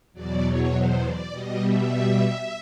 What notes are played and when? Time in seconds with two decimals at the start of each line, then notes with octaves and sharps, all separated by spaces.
0.13 E2 B2 F#3 D5
0.43 C#5
0.72 C5
1.02 D5
1.31 B2 G3 D#5
1.60 E5